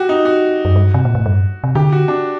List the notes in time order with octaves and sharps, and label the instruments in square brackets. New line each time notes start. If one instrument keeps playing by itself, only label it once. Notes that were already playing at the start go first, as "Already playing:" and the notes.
Already playing: [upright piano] F#4 G4
D#4
F#4
[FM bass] F#2
G2
C3
A#2
A2
G2
C3
[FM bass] D3 [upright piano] G4
[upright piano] F#4
D4